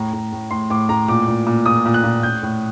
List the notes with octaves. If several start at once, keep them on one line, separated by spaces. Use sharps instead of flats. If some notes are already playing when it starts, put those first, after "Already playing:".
Already playing: A2 A#5
A2
A2
A2 C6
A2 D6
A2 A#5
A#2 D6
A#2
A#2
A#2 D#6
A#2
F#6
A#2
A2 G6
A2